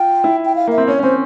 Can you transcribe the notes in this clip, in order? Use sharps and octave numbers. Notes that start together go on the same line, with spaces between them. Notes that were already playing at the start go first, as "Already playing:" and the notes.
Already playing: F4 G5
E4
G5
F5
A#3 E5
C4
C#4 C#5
C#4
C4 C5